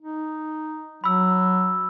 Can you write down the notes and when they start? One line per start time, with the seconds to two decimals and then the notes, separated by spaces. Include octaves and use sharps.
0.01 D#4
1.04 F#3 B5 E6